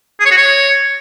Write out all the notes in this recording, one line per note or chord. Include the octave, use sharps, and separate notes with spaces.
G#4
C#5
F#4
C#5